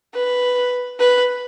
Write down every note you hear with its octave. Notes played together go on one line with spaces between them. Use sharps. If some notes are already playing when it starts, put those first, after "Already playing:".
B4
B4